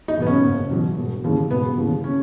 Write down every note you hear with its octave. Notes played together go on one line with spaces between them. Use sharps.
D#4
E2 B2 F#3 B3
C#4
F#1
E2 B2 F#3
E1
D#2 C#3 E3
E1 B3
D#2 C#3 E3
C#4